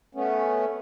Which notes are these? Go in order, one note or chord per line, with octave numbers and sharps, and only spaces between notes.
A3 B3 C#4